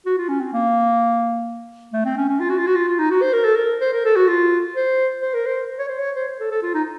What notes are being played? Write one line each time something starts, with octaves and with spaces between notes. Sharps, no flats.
F#4
F4
C#4
C4
A#3
A3
C4
C#4
C#4
F4
F#4
F4
F#4
F4
F4
D#4
F#4
C5
A#4
A4
A#4
C5
A#4
A4
F#4
F4
C5
C5
A#4
C5
C#5
C5
C#5
C5
C5
A4
A4
F4
D#4